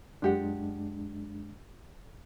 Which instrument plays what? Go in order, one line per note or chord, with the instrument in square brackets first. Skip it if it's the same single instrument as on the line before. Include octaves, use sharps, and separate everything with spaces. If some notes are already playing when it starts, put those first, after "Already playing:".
[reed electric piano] F#2 G#3 D4 [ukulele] F4 G4 F#5